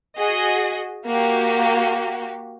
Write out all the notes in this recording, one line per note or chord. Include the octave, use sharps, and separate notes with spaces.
F#4 G#4 D#5
A#3 F#4 G4